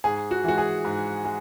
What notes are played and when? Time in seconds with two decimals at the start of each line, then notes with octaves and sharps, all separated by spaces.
0.04 G#2 G#4
0.31 F#4
0.44 E3 G#3 F#4
0.58 G#4
0.85 G#2
1.25 G#3